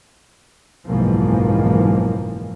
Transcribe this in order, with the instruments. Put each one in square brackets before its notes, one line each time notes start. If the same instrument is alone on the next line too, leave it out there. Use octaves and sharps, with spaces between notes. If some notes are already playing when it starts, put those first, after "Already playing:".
[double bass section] F#1 B1 G#2 E3 F3 A#3